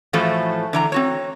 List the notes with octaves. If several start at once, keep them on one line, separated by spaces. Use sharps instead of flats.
A2 E3 F3 A3 F#4 A4
D3 E3 A#5
C4 F#4 C#5